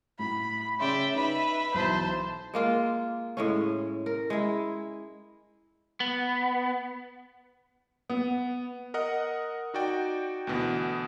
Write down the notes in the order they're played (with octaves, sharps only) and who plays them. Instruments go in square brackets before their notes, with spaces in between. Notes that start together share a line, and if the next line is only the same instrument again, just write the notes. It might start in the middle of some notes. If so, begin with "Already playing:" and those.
[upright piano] A2 [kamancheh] B5
[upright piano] C#3 C#4 C6 [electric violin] D5 G5 [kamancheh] E5
[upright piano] D#4 E7 [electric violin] B4 B5
[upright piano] B1 E3 [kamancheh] C5 A5
[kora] G#3 A#3 F4
A2 G#3 C#4
A#4
G#3 E4
[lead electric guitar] B3
[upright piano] B3
[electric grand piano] A#4 D#5 F#5
D#4 F#4 D5 G5
D2 B2 E3